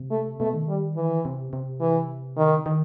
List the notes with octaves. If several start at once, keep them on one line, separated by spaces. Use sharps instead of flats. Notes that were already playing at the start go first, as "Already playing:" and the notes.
Already playing: C3
A3
B2 A3
D#3
G3
E3
C3
C3
E3
D#3
D#3